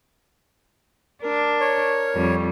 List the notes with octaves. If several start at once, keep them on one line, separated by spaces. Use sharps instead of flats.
D4 A#4
C#5
F2 G3